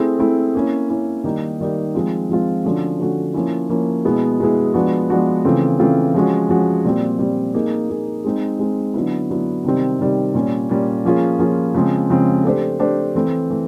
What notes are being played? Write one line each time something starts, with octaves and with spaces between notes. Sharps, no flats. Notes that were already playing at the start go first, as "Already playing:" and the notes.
Already playing: A3 C4 E4 G#4
A3 C4 E4 G#4
A#3 C#4 E4
A#3 C#4 E4
D#3 G3 A#3 D#4
D#3 G3 A#3 D#4
F3 G#3 C4 F4
F3 G#3 C4 F4
D3 F3 A3 C#4 F#4
D3 F3 A3 C#4 F#4
F3 A#3 C#4 E4
F3 A#3 C#4 E4
B2 G#3 B3 E4 G#4
B2 G#3 B3 E4 G#4
F3 G#3 B3 D4 F#4
F3 G#3 B3 D4 F#4
C#3 E3 A3 C4 F4
C#3 E3 A3 C4 F4
F3 G#3 C#4 F#4
F3 G#3 C#4 F#4
A#2 G3 C4
A#2 G3 C4
A#3 D#4 G#4
A#3 D#4 G#4
G#3 C4 D#4
G#3 C4 D#4
D3 F#3 B3 E4
D3 F#3 B3 E4
C3 D#3 G3 C4
C3 D#3 G3 C4
A#2 G3 A#3 C#4
A#2 G3 A#3 C#4
F3 A#3 C#4 F4 G#4
F3 A#3 C#4 F4 G#4
C#3 F3 G#3 C4
C#3 F3 G#3 C4
A3 D4 G4 C5
A3 D4 G4 C5
E3 A3 C4 E4
E3 A3